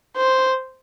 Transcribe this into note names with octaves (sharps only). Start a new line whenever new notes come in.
C5